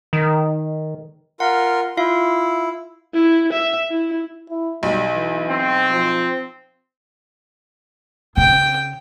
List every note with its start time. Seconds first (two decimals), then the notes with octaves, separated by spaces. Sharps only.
0.13 D#3
1.40 F4 A#4 F#5 C6
1.97 E4 F4 F5
3.14 E4
3.53 E5
3.91 E4
4.50 E4
4.83 B1 G3
5.14 E3
5.49 C4
5.91 F3
8.37 C#3 G5